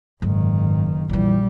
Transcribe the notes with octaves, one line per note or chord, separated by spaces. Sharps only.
F#1 G#2 D3 D#3
A#1 F2 E3 G3